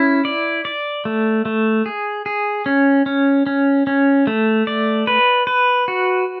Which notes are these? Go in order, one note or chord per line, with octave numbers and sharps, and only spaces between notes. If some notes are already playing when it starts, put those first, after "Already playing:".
Already playing: C#4 E4
D5
D5
A3
A3
G#4
G#4
C#4
C#4
C#4
C#4
A3
D5
B4
B4
F#4